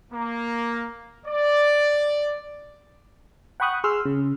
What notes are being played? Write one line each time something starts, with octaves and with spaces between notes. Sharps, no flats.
A#3
D5
F#5 G5 B5 C#6 D#6 F#6
G#4 C6 E6 F6
C#3